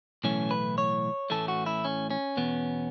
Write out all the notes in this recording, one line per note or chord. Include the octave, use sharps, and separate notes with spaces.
B1 A2 E3 A3 C#4
B4
C#5
A2 E3 A3 C#4 A4
F#4
E4
C#4
C#4
E2 B2 B3